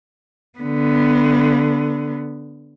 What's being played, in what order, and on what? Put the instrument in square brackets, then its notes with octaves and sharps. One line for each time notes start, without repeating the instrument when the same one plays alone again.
[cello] D3 B3